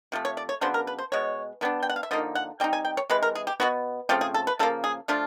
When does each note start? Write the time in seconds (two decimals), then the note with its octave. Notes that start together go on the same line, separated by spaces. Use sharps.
0.12 C3 F3 A3
0.25 C#5
0.37 D5
0.49 C#5
0.61 C#3 F#3 B3 D4 C5
0.74 A#4
0.87 B4
0.99 C5
1.12 B2 G#3 C#5
1.61 E3 G3 B3 D4
1.83 G5
1.90 F#5
1.96 F5
2.03 E5
2.11 D3 F3 A#3 D#4 D#5
2.35 F#5
2.60 G3 C4 D#4 G5
2.73 G#5
2.85 G5
2.97 C#5
3.10 C3 E3 G#3 B4
3.23 A#4
3.35 G#4
3.47 G4
3.60 B2 G3 B3 F#4
4.09 C#3 F3 A3 C4 G4
4.21 G#4
4.34 A4
4.47 B4
4.59 C#3 F3 A#3 A4
4.84 G#4
5.08 F3 A3 D4 F4